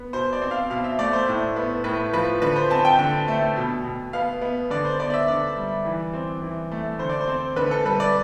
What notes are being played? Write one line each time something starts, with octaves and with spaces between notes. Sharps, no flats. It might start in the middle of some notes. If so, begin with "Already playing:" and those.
Already playing: B3
B2 C5
D5
C4
F5
B2 F5
E5
A3 D5
C5
A2
B3
A2 B4
F3 B4
D3 B4
C5
C4 A5
G5
D3
A3
B2
B2
B3 F5
B3
D3 D5
C5
B3 D5
D5
E5
D3 D5
G3
E3
C4
E3
A3
D3 C5
D5
C5
C4
D3 B4
A4
G3 B4
D5